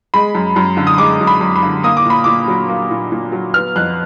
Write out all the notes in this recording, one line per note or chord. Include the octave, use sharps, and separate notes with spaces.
G#3 B5
F#2
F#2
D3
D#6
G#3 D6
F#2
B5
F#2
B5
D3
A#3 D#6
D6
A#2 B5
A#2 D6
F#3
A#3
A#2
A#2
F#3
B3 F6
F2 F#6